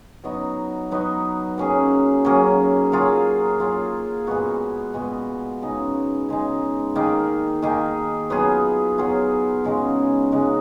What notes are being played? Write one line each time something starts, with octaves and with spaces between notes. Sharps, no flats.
F#3 B3 D#4 F#4
F#3 B3 D#4 F#4
F#3 A#3 C#4 G#4
F#3 A#3 C#4 G#4
F#3 A#3 F4 G#4
F#3 A#3 F4 G#4
A#2 G#3 B3 F#4
A#2 G#3 B3 F#4
C#3 G#3 D#4
C#3 G#3 D#4
D#3 A#3 D#4 G#4
D#3 A#3 D#4 G#4
F#3 B3 F4 G#4
F#3 B3 F4 G#4
C#3 G#3 D#4 F#4
C#3 G#3 D#4 F#4